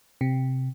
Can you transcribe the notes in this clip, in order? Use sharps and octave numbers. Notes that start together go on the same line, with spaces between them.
C3